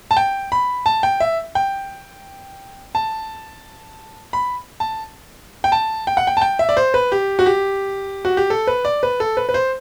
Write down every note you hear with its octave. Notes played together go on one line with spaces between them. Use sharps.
A5
G5
B5
A5
G5
E5
G5
A5
B5
A5
G5
A5
G5
F#5
G5
A5
G5
E5
D5
C5
B4
G4
F#4
G4
F#4
G4
A4
B4
D5
B4
A4
B4
B4
C5